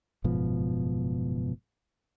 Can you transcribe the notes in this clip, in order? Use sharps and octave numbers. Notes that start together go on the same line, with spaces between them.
F#1 G#2 B2 F3